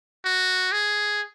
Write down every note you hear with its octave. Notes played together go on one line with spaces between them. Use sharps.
F#4
G#4